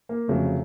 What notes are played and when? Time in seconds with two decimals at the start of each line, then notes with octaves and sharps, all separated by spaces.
0.09 A#3
0.28 F1 F2 C#3 F#3 A3